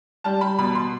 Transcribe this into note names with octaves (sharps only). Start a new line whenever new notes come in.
G3 A5
G3 B5
B2 B5
B2 C6